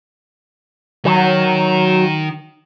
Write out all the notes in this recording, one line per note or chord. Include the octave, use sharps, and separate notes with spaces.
D#3 F#3